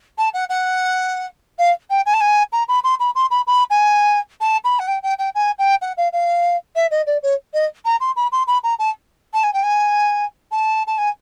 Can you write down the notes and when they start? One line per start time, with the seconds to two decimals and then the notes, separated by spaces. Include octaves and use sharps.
0.18 A5
0.34 F#5
0.49 F#5
1.59 F5
1.90 G5
2.06 G#5
2.14 A5
2.21 G#5
2.52 A#5
2.68 B5
2.84 C6
3.00 B5
3.15 C6
3.31 B5
3.47 B5
3.70 G#5
4.41 A5
4.64 B5
4.79 F#5
4.88 G5
5.03 G5
5.19 G5
5.35 G#5
5.59 G5
5.82 F#5
5.97 F5
6.13 F5
6.76 E5
6.91 D#5
7.07 D5
7.23 C#5
7.54 D#5
7.85 A#5
8.01 C6
8.16 B5
8.32 C6
8.47 B5
8.64 A#5
8.79 A5
9.34 A5
9.43 G#5
9.53 G5
9.63 G#5
10.51 A5
10.87 A5
10.98 G#5